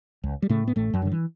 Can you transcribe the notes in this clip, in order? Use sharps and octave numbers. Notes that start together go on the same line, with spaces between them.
C#2
G3
A2 C#3 A3
B3
A1 A2 A3
F#2 F#3
G2 D3
E3